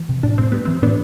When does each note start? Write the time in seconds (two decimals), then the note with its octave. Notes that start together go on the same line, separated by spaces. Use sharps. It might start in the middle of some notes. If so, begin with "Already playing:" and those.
Already playing: E3
0.09 C3
0.23 A2 D4
0.38 A2 C4
0.52 G3 B3
0.65 E3 C4
0.82 A2 B3 D4